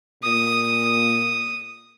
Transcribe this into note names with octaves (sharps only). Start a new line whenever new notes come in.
A#2 D#6